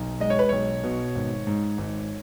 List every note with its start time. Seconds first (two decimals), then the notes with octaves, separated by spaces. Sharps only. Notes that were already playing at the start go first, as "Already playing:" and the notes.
Already playing: B1
0.20 G#3 D#5
0.30 C#5
0.39 B4
0.49 B1 C#5
0.84 B2
1.15 G#1
1.47 G#2
1.78 G#1